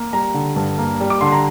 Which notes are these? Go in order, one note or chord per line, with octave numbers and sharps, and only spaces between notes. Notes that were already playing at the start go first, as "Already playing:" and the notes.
Already playing: A#3
G3 A#5
D3
G2
A#3
G3
D6
D3 C6
A#5